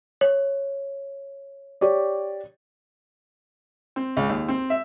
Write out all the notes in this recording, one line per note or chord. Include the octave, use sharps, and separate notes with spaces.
C#5
G4 C#5 D5
C4
C#2
D#2
C4
E5